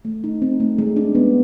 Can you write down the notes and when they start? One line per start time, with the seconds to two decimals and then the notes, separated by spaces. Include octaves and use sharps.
0.05 A3
0.24 D#4
0.42 C4
0.60 A3
0.78 G#3
0.96 D4
1.15 B3